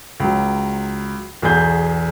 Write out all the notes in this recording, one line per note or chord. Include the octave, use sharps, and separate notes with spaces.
C#2 F#3
B1 E2 G#4 G6